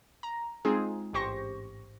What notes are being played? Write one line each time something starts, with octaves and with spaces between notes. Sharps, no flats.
A#5
G#3 C4 D#4 F4 G#4
A1 G#2 G4 C5 C#6 A#6